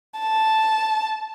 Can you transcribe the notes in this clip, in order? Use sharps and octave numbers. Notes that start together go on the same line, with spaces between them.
A5